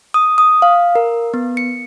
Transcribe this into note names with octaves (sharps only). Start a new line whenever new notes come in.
D#6
D#6
F5
A#4
B3
C#7